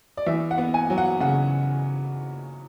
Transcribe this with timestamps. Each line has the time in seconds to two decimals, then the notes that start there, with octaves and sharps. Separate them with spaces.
0.17 D5
0.26 E2 E5
0.51 F#5
0.58 B3
0.74 G#5
0.90 F#3
0.98 F#5
1.20 C#3 F#5